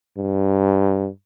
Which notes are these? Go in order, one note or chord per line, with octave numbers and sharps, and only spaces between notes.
G2